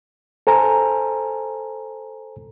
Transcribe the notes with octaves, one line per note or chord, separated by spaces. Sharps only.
A4 C5 G#5 A#5